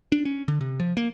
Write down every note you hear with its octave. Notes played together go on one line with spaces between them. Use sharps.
D4
C#4
D3
C3
F3
A#3